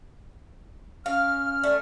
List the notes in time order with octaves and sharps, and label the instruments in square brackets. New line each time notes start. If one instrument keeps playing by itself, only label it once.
[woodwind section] C#4 F6 [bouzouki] F5
[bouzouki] A3 [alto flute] D5